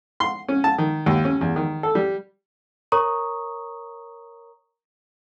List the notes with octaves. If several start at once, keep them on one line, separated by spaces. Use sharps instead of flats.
C6
C#4
A5
D#3
D#2
C#4
E2
D#3
A4
G3
A#4 C#5 A#5 C#6 D#6